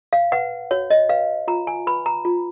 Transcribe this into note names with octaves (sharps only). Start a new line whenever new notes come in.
F5
B4 F#5
F#4 C#5
D#5
B4 F5
F4 A#5
G#5
B4 B5
A#5
F4